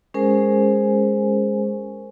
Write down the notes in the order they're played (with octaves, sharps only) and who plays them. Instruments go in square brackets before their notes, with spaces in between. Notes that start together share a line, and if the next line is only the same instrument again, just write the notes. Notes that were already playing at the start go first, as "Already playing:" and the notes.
[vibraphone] G#3 C#4 G#4 A#4 C5 G#5